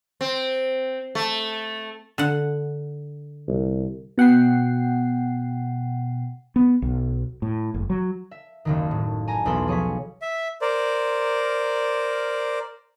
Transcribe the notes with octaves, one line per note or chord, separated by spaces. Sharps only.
C4
A3
D3 F#5
C2
B2 F#5 G5 C7
B3
B1
A2
F#1
F#3
E5
F#1 D#2 D#3
A2
G#5 A#5
B1 E2 A4 B5 C6
F3 G#4 C#5 C#6 B6
E5
A#4 C5 D5